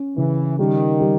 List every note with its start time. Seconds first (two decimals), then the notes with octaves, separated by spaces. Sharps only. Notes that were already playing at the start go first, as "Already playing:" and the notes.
Already playing: C#4
0.17 C#3 E3
0.59 D#3 G3
1.00 G3